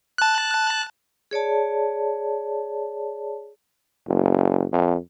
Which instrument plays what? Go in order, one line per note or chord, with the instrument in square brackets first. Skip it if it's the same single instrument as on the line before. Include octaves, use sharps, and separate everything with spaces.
[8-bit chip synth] A5 F#6
[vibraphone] G#4 C#5 D5 A5
[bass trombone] F#1
F2